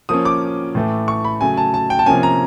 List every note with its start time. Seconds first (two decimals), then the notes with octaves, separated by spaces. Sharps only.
0.09 F3 A#3 C#4 D#6
0.25 D6
0.75 A2 E3 A3
1.08 C#6
1.24 B5
1.41 C#3 F#3 A3 G#5
1.57 A5
1.74 A5
1.90 G5
1.99 A5
2.06 C3 F3 A#3 C#4 G#5
2.23 A#5